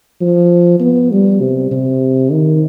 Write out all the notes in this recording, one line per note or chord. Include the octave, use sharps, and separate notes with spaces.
F3
B3
G3
C3
C3
D#3